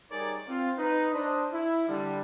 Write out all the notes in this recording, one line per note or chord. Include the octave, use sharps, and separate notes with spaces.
G3 D#4 G#4 A#4 C#5 D5
C4 F4
D#4 B4
D4 C5 D#5
E4
D3 G3